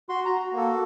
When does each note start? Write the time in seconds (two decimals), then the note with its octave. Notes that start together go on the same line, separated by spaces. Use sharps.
0.09 F#4 C6
0.25 F#4 A#5
0.52 A#3
0.57 A4